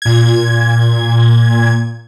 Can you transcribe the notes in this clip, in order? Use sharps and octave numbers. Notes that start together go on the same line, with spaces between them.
A#2 G#6